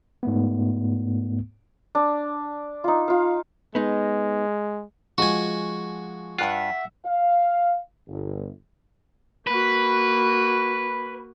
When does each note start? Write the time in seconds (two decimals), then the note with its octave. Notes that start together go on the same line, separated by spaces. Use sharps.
0.23 G#2 A3 B3
1.95 D4
2.84 D#4 F4
3.08 F4 F5
3.75 G#3 B3 D#4
5.18 F3 G#3 F#4 G#5
6.38 G2 F4 E5 F#5
7.05 F5
8.08 G1
9.47 A#3 F#4 B4